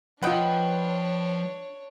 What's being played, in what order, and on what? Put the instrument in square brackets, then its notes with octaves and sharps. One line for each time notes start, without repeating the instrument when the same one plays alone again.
[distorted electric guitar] F3 [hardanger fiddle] D4 C#5 [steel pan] F4 D#5 F#5 [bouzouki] B4 G5